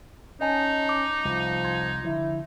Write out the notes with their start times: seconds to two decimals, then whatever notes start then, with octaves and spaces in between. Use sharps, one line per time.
0.41 C#4 D#4 D#5 G#5 A5
0.89 D6
1.25 C2 F3
1.64 C6 G#6
2.05 D3 F3 E4